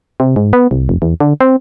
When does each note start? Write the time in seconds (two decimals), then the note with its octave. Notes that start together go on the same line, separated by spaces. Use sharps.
0.20 C3
0.36 G#2
0.53 B3
0.71 C2
0.89 F1
1.02 E2
1.20 D3
1.40 C4